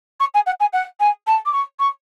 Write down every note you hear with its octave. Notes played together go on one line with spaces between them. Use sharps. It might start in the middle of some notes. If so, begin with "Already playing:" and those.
C#6
G#5
F#5
G#5
F#5
G#5
A5
D6
C#6
C#6